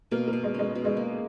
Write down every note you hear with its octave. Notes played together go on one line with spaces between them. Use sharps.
B2 A#3
A#3
B2
G#3
G#3 C#4
B2
G#3
A#3